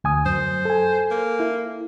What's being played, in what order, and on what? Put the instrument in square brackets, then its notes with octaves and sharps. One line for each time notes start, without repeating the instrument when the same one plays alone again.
[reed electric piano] D2 G#5 D#6
[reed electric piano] F#2 [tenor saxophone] C5
[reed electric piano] A4 G#5
[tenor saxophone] A#3
[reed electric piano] E4